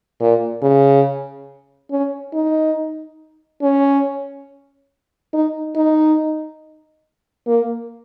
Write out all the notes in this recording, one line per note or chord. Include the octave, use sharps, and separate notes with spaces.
A#2
C#3
C#4
D#4
C#4
D#4
D#4
A#3